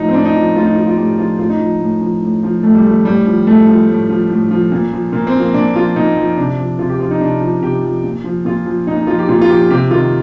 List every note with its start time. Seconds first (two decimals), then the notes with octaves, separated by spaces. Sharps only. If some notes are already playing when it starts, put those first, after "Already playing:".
Already playing: A2 F3 D#4
0.09 C4
0.14 A2 D4
0.25 D#4
0.35 F3
0.56 A2 F4
0.66 D#4
0.76 F3 F4
0.87 F4
0.97 A2 G4
1.18 F3 F4
1.39 A2 F4
1.49 D#4
1.60 F3
1.80 A2
2.01 F3
2.22 A2
2.43 F3
2.63 A2 A3
2.75 G3
2.85 F3 A3
3.05 A2 G3
3.26 F3
3.47 A2 A3
3.67 F3
3.89 A2
4.09 F3
4.30 A2
4.51 F3
4.72 A#2
4.92 F3
5.13 A#2 A#3
5.27 C4
5.34 F3
5.40 A#3
5.54 A#2 D4
5.75 F3 F4
5.96 A#2 D#4
6.17 F3
6.37 C3 D4
6.58 F3
6.79 C3 F4
6.89 G4
7.00 F3 F4
7.11 D#4
7.21 C3 D4
7.41 F3
7.62 C3 G4
7.83 F3
8.04 A#2
8.24 F3
8.45 A#2 F4
8.66 F3
8.87 A#2 D#4
8.97 D#4
9.07 F3 F4
9.19 G4
9.29 A#2 F4
9.41 F4
9.49 F3 G4
9.70 C3 G4
9.91 D#3 F4